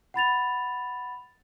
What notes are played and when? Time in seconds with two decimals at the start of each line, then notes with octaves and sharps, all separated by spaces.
0.14 F#5 B5 A6 F7